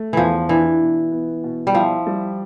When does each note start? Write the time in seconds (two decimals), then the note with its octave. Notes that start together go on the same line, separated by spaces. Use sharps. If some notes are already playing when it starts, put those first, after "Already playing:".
Already playing: A3
0.13 E2 E3 F3
0.49 E3 D4
0.81 B2
1.12 B3
1.44 B2
1.67 G3
1.75 F3 E4
2.07 G3